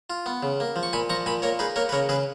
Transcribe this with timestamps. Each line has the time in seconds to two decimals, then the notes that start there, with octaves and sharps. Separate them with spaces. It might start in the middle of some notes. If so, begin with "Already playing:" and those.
0.10 F4
0.26 B3
0.43 C#3
0.60 A#3
0.76 F3
0.83 C#6
0.93 A#2 G#5 B5
1.10 F3 A#5 C#6
1.26 A#2 G#5 B5
1.42 A#3 A#4 C#5
1.59 D#4 G#4 B4
1.76 A#3 A#4 C#5
1.89 B4
1.92 C#3 A#4 C#5
2.09 C#3 G#4 B4